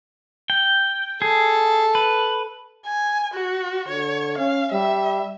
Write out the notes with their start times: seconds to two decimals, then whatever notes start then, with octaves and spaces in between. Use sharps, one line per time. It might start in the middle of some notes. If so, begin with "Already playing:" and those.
0.50 G5
1.22 G#4 A4
1.95 B4
2.86 G#5
3.34 F#4
3.88 D3 C#5
4.38 C#4 F5
4.72 G3 E5